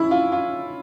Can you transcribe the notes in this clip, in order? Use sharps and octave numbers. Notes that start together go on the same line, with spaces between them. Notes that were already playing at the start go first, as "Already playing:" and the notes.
Already playing: C#4 E4
F4
F4